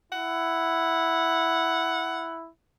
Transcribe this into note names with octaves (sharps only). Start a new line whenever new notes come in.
E4 F#5